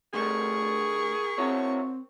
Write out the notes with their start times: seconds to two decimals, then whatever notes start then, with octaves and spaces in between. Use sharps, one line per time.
0.14 D2 A3 G4 G#4 A#4 C#6
1.38 C4 E4 F#4 C#5